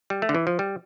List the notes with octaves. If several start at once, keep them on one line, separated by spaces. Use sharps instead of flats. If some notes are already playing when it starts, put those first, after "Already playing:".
G3
A3
D3
E3
F3
G3